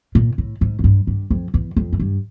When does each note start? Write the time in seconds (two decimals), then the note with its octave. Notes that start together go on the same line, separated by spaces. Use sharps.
0.15 A#2
0.38 A2
0.61 G#2
0.79 F#2
0.84 G2
1.07 G2
1.30 F2
1.54 E2
1.76 F2
1.93 G#2
1.99 G2